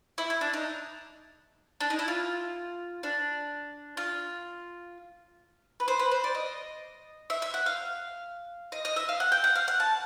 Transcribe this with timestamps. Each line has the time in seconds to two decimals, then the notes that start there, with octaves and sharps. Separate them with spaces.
0.18 E4
0.30 E4
0.41 D4
0.53 D#4
1.80 D4
1.90 D#4
1.99 E4
2.08 F4
3.03 D4
3.97 F4
5.80 B4
5.88 C5
5.99 B4
6.11 C5
6.24 D5
6.35 D#5
7.30 E5
7.42 E5
7.54 F#5
7.66 F5
8.72 D#5
8.85 D#5
8.96 E5
9.09 F5
9.20 F#5
9.32 G5
9.44 F#5
9.55 F5
9.68 F#5
9.80 A5